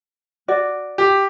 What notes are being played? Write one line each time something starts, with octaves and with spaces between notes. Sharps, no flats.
F#4 D5
G4